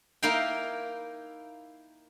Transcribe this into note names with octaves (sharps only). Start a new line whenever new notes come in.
A#3 D#4 E4 A#4 F5 G5